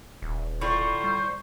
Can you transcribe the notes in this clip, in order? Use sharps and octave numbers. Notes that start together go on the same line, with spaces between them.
D#1
A2 D3 F4 C5 C#6
G3